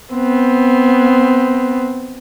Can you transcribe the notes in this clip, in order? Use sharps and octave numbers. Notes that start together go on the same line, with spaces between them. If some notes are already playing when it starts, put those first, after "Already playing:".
B3 C4